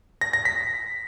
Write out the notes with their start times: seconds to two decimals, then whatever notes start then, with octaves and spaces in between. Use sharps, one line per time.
0.21 A#6
0.33 A#6
0.45 B6